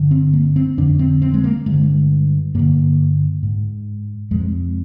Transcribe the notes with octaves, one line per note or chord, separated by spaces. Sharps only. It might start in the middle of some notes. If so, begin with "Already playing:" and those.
Already playing: G2 D3
C4
A#3
C4
F2 D3 D4
C4
C4
G#3
A#3
G2 D3 G#3
G2 D3 A#3
G#2
F2 C3 G#3